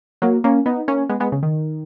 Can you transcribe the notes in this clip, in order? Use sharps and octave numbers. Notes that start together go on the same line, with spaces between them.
F#3 A#3
A#3 C#4
B3 D#4
A#3 C#4
G#3 B3
G#3 B3
C#3
D#3